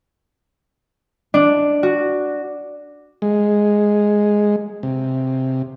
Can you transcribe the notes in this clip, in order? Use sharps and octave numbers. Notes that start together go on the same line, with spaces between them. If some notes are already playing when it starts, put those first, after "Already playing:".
D4
F#4
G#3
C3